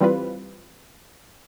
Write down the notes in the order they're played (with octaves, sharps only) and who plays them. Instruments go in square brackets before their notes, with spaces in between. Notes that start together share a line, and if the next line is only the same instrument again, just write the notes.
[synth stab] E3 G3 C4 F4 B4